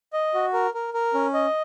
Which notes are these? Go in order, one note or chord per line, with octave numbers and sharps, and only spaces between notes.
D#5
F#4
A#4
A#4
A#4
C#4
D#5